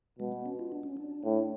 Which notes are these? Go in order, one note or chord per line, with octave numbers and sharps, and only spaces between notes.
B2 G#3
B3
C#4
F4
D4
C#4
D4
A2